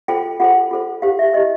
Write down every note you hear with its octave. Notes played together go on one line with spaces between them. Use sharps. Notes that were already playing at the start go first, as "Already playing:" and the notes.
F4 A4 C5 G5
F4 A4 C5 F#5
F4 A4 C5
E4 G4 C5 F5
E5
E4 G4 C5 D#5